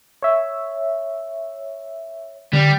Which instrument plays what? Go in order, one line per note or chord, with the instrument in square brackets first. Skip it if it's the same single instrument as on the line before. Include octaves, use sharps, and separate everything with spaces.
[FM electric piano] C#5 E5
[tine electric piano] D3 [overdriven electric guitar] G3